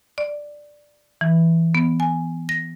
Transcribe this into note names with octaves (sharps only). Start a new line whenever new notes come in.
D5
E3
B3
G#5
A#6